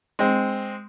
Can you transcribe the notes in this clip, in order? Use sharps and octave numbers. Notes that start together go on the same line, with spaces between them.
G#3 C4